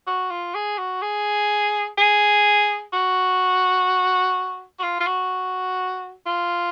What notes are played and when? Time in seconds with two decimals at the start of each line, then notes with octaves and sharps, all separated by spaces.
0.07 F#4
0.30 F4
0.55 G#4
0.78 F#4
1.02 G#4
1.98 G#4
2.93 F#4
4.79 F#4
4.83 F4
5.00 F4
5.07 F#4
6.26 F4